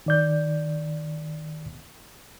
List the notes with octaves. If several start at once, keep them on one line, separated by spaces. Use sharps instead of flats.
D#3 D5 G6